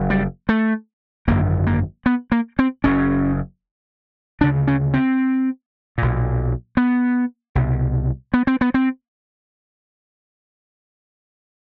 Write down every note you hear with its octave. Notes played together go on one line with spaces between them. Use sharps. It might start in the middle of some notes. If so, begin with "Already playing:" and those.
Already playing: F#1 F#2
G3
A3
G#1 F#2 D3 A#3
A#3
B3
A#3
C4
F#1 F#2 C#3 C#4
D2 C#3 D4
C#4
C4
B1 A#2
B3
C2 B2
B3
C4
B3
C4